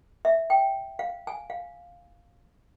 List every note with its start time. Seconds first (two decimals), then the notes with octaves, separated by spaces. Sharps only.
0.25 E5
0.50 G5
0.99 F5
1.27 G#5
1.50 F5